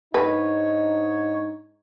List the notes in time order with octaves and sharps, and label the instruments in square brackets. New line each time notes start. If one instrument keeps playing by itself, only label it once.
[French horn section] G#2 D4 D#4 [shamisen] B4 [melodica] C#5